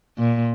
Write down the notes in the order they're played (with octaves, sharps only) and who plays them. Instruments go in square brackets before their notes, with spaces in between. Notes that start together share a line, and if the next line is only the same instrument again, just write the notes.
[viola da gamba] A#2